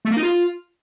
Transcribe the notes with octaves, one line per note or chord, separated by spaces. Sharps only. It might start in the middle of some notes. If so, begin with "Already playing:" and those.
A3
A#3
D#4
F4